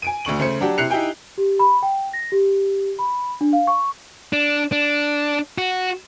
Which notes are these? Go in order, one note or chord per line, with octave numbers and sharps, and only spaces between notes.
G#5 D7 D#7
D2 D3 C#6 F#7
C#3 A3 C5 C#7
F#3 D4 F#4 G4
C3 E4 F#6 C7 C#7 F7
D#4 E4 G4 G5 G#5
G4
B5
G5
A#6
G4
B5
D4
F5
C#6
D4
D4
F#4